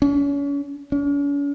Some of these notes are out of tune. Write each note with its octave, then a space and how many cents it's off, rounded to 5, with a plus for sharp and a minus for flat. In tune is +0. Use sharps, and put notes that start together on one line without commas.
C#4 +35
C#4 +45